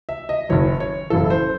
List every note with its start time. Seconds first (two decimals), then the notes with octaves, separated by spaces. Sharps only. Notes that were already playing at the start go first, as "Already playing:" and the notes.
0.09 E5
0.29 D#5
0.49 F#1 F#2 D#3 F#3 C#5
0.80 C#5
1.10 F#1 F#2 C#3 E3 A4
1.30 C5